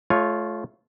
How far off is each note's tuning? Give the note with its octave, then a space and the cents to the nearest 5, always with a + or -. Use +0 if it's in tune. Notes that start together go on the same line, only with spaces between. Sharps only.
A3 -30 F4 +0 C#5 +0